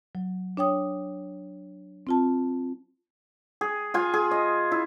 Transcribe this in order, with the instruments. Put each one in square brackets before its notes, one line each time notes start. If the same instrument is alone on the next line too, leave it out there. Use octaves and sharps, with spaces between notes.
[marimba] F#3
D4 C#5 G5 D#6
C4 F4 A5
[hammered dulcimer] G#4
F4 G#5
G#4
D#5
E4